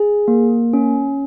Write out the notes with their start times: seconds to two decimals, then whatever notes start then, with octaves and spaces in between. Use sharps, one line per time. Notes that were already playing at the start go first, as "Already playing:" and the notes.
Already playing: G#4
0.28 A#3
0.73 C#4